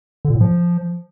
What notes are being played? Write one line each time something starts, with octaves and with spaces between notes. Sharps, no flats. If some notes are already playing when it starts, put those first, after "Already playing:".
D3
A#2
A2
F3